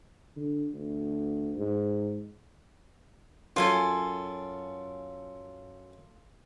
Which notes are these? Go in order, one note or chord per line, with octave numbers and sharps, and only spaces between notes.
D3
D2
G#2
F#2 F4 A4 G#5